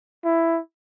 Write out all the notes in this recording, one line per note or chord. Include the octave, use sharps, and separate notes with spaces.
E4